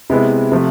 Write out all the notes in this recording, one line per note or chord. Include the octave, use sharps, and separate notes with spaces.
C3 G#3 B3 E4
C3 F3 A3